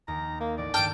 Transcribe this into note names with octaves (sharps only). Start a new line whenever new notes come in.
D#2 A#5
A#3
A1 D5
G2 D#3 G5 A5 D6 F6 D7